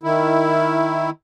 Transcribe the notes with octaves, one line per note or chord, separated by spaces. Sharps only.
D#3 E4